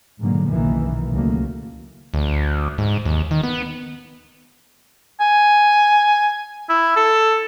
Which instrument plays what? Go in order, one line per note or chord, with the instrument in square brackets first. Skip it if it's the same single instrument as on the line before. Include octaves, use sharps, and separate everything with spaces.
[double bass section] G#2 B2 D3 F#3 A#3
F#1 B1 B2 D#3 E3 A#3
C#2 D#3 F#3 A3 A#3
[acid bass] D2
G#2
D#2
D#3
B3
[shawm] G#5
E4
A4